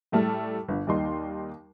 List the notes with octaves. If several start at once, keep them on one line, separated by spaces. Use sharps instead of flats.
A2 G3 A3 A5 F6
G1
D#2 G3 D#4 C6